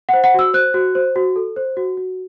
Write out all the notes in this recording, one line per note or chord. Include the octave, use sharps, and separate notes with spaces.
F#5
C5
F#5
F#4 E6
C5 F#6
F#4
C5
F#4
A4
C5
F#4
F#4